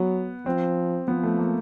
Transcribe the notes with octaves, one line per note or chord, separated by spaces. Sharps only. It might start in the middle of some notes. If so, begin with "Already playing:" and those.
Already playing: F#3 B3
F3 C4
F3 B3
A3
A#3